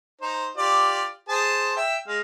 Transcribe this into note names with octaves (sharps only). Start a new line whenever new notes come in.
D#4 C5
F4 G4 D5
G#4 C5 A5
E5 G5
G#3 F5